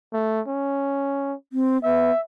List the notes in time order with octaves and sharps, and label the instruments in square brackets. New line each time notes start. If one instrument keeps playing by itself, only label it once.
[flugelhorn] A3
C#4
[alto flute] C4
[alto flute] B3 [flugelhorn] E5